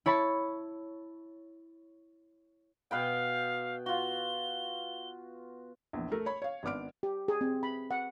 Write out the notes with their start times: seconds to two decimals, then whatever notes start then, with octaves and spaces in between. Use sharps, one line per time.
0.06 E4 C#5 A5 B5
2.91 B2 B4 F5 G5
3.86 F4 F#4 G7
5.93 A#1 E2
6.12 A3 A4 A#4
6.26 C#5 B5
6.42 C#5 F5
6.63 G#1 B3 D4 D6 F6 D7
7.03 G4
7.28 G#4
7.41 C4
7.63 B5
7.91 F#5